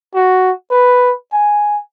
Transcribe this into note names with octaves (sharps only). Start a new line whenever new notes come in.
F#4
B4
G#5